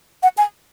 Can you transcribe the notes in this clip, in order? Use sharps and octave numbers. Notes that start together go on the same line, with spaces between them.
F#5
G#5